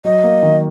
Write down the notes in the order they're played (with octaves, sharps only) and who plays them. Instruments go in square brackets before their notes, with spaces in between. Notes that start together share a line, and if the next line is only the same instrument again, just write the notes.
[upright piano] F#3 [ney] D#5
[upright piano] A#3
D#3